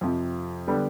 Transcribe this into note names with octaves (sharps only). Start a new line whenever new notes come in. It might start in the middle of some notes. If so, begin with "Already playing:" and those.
F2 C3 F3
D3 G3 B3